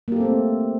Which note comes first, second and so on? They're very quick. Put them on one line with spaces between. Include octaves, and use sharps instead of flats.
A#3 G4 A4 C4 A3